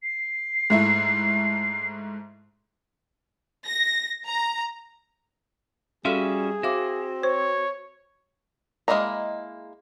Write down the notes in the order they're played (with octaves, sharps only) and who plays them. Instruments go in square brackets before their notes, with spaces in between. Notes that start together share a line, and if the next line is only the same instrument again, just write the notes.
[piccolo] C7
[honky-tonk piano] G#2 A3 E4
[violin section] A#6
A#5
[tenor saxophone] G3 [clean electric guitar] C#4 F#4 E5 [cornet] G#4 [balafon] A4 F5 C6
[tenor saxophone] C4 [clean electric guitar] F#4 [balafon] E5 F5 D6
[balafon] C5 [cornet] C#5
[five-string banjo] G#3 A#3 E4 D#5 A#5